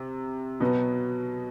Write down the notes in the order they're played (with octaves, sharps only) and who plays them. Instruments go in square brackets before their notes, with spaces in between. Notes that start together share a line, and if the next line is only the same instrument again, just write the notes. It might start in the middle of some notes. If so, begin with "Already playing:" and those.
Already playing: [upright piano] C3
B2 F#3 B3